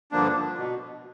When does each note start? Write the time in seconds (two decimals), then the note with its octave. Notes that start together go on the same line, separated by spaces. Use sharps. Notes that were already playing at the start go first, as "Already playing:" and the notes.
0.12 G2 D3 F3 A#3 D4
0.58 B2